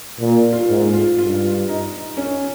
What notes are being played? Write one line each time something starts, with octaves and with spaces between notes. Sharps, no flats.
A#2
F4
G#2
F4
G2 F4
D#4
C#4